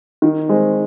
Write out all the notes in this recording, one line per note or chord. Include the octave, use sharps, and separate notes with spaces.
D#3
G#3 C4